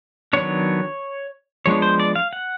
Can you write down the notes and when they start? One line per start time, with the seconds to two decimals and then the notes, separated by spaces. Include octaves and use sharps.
0.33 D#3 F#3 B3 D4 C#5
1.66 F3 G#3 B3 D4 C#5
1.82 C5
2.00 D5
2.15 F5
2.33 F#5